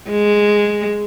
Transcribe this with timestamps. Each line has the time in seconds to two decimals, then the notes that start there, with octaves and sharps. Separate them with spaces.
0.10 G#3